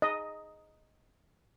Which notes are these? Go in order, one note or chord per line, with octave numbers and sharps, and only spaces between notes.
D#5